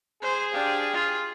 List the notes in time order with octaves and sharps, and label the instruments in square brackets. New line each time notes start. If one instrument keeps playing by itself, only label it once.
[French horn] G#4 [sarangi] C5
[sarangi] D4 [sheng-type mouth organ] G4 F5 G5
[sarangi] F4 [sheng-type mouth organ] F6